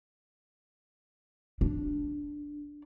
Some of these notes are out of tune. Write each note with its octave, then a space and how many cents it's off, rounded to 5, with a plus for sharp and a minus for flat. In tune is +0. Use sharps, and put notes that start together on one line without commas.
D4 -5